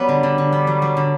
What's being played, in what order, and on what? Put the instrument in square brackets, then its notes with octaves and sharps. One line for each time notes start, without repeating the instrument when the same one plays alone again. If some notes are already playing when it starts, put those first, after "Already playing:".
Already playing: [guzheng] F#3 B3 [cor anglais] G3
[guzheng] D3
D3
D3
B3
F#3
F#3
D3